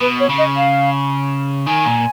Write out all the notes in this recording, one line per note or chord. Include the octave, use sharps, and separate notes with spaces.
B2 B4
C#5
C#3
D#5
F5
D#3 G#5
A#2